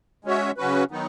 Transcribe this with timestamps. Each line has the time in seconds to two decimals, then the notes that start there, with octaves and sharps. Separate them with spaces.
0.25 G#3 C#4 F#4 C#5 E5
0.57 C#3 F#3 C#4 F#4 B4
0.91 D#3 F#3 B3 D#4